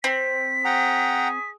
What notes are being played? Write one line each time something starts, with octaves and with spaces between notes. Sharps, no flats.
C4 B6
G#4 F#5 G5 A#5